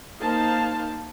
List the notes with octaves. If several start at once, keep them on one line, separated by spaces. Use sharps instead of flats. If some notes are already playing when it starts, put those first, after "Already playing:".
A#3 D#4 C5 F5 A5